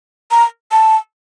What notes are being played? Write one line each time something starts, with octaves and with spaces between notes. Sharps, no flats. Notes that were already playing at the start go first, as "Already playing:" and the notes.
A#5
A5